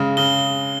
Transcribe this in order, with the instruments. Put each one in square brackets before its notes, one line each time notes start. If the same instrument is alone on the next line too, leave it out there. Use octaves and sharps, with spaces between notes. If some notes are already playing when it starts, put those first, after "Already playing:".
Already playing: [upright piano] C#3 G#3
[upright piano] C#3 [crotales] G7